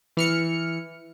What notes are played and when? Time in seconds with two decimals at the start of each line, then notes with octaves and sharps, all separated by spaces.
0.17 E3 F6 C#7